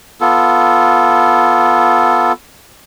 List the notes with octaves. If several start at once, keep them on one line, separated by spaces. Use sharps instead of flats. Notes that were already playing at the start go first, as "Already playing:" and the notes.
B3 F4 A4